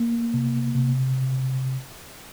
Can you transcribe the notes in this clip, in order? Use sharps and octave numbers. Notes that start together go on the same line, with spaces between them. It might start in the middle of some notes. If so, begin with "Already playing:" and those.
Already playing: A#3
C3
C3